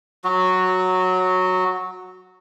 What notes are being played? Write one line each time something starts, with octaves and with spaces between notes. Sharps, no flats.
F#3 F#4